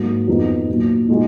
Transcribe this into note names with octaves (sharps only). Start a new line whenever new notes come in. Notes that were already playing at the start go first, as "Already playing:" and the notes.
Already playing: G#2 F#3 A#3
F2 F3 B3 D#4 F#4
A#2 F#3 A#3
A#2 G#3 D#4 F#4